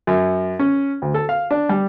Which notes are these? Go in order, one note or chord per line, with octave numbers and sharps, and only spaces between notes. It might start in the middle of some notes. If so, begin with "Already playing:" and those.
F#2
C#4
D2
A4
F5
D4
G3